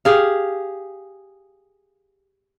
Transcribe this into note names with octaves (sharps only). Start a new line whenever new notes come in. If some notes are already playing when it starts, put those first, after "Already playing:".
G4 G#4 F5